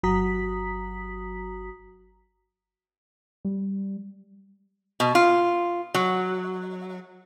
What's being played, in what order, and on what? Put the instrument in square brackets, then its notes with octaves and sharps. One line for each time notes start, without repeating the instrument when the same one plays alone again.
[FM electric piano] G1 F#3 F#4 A#5 D#6 B6
[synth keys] G3
[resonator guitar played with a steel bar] B2
F4
F#3